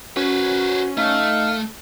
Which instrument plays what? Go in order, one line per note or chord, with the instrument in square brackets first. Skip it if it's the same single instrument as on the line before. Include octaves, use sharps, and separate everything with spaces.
[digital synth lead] C#4 [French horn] F#4 [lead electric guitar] B4 C5
[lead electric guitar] A3 [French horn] D#4 [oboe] F5